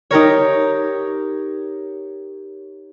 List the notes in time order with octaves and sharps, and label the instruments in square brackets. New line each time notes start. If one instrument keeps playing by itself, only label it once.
[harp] D#4 G4 A#4 C#5